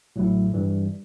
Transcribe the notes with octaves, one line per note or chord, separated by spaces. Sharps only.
A1 A2 F#3 A3 E4
G2 E3 G3